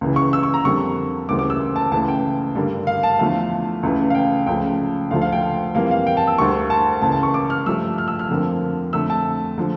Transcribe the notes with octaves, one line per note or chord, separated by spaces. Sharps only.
C#2 C#3 E3
C#6
E6
C#6
A#5
F2 D3 G3 A#3 C#6
D2 C#3 E3 G3 A#3 D6
D6
E6
A5
C#2 C#3 E3 A3 A5
G5
G2 D3 G3 A#3
F5
A5
E2 D3 F3 A3 F5
C#2 C#3 E3 A3
F5
G5
C#2 C#3 F3 A3 G5
D2 D3 F3 A3 F5
F5
G5
F2 E3 G3 A#3 F5
F5
G5
A5
E6
D2 D3 G3 A#3 C#6
A5
C#2 C#3 E3 A#3 A5
A5
C#6
D6
F6
G2 F3 A3 E6
F6
E6
F6
F2 D3 F3 A#3
F2 D3 A3 E6
A5
D3 F3